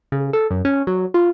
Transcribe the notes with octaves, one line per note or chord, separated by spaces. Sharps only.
C#3
A4
F#2
C#4
F#3
F4